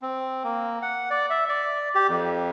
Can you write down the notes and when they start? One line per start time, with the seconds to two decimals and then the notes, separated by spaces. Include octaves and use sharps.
0.02 C4
0.44 A#3
0.82 F#5
1.10 D5
1.30 E5
1.49 D5
1.95 G4
2.08 F2